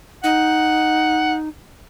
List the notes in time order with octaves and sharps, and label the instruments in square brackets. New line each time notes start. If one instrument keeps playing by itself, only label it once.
[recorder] D#4 [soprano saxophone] F#5